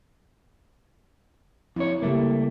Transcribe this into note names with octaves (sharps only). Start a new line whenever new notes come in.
F2 C4 E4 C#5
C#3 G3 A3 A#3 G4